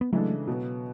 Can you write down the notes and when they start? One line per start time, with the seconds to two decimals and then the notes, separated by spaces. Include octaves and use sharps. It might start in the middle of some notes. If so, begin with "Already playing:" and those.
0.01 B3
0.12 C#3 E3 F#3 G#3 A3 D4 A4
0.47 B2 F#3 B3